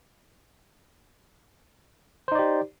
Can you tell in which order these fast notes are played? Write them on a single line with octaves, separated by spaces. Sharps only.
C5 D#4 D5 G4